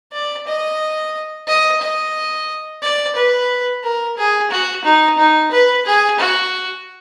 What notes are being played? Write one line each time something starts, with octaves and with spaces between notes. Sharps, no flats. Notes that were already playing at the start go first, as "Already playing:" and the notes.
D5
D#5
D#5
D#5
D5
B4
A#4
G#4
F#4
D#4
D#4
B4
G#4
F#4